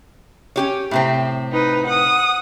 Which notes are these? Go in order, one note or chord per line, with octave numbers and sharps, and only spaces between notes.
C#4 G4 C#5
A2 C3 C4
D#4 B4
F#5 D#6